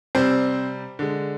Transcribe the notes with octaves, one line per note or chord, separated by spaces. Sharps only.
C3 G3 C4 C5
D3 G#3